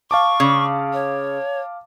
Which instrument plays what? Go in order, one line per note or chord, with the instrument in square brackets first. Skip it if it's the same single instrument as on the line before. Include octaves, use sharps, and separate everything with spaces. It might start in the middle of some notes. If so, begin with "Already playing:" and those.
[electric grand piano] F5 A5 D6 [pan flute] C#6
[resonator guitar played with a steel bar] C#3
[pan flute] C#5